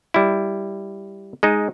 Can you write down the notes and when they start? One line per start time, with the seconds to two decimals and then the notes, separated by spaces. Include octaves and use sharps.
0.14 G3 E4
1.43 G#3 D#4